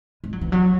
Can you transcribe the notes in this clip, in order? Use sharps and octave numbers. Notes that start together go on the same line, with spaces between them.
G#3
F#3
E3
F#3